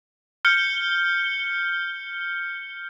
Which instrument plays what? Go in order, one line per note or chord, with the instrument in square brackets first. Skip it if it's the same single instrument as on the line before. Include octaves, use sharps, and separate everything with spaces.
[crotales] F6 G6 C#7 G7